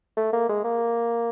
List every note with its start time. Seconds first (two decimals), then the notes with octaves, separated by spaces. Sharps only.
0.17 A3
0.33 A#3
0.49 G#3
0.64 A#3